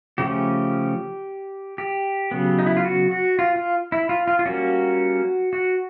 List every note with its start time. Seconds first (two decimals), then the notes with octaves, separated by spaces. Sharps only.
0.18 C#3 F3 A3 C#4 G4
1.78 G4
2.31 C#3 F#3 B3
2.59 D#4
2.66 E4
2.77 F4
2.85 F#4
3.11 F#4
3.39 F4
3.56 F4
3.92 E4
4.09 F4
4.27 F4
4.39 F4
4.46 G3 A#3 C#4 F#4
5.53 F#4